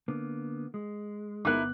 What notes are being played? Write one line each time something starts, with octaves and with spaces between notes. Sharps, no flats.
D3 A#3 B3
G#3
G1 C3 B3 D#4 E4 A#4 D6 F#6